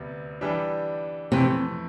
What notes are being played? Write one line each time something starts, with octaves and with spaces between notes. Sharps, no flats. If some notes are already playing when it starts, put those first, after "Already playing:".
Already playing: D2 C3 G3 B3
E3 G3 D4 G4
F2 C3 E3 A3